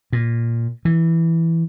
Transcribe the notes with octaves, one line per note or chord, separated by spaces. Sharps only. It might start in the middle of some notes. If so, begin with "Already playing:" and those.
A#2
E3